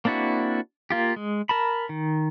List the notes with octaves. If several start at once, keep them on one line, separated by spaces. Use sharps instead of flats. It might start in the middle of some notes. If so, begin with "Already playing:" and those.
A#3 C4 D4 E4 F#4
A#3 F4 G4
G#3
A#4 A5 B5
D#3